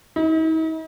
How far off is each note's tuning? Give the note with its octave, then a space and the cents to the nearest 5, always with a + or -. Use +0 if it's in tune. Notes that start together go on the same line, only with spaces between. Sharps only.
D#4 +45